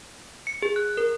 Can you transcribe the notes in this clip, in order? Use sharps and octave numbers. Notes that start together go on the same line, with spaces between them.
C#7
G#4
F#6
A#4